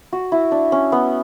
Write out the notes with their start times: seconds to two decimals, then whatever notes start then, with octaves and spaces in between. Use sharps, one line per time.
0.13 F#4
0.32 E4
0.52 D4
0.72 C#4
0.92 B3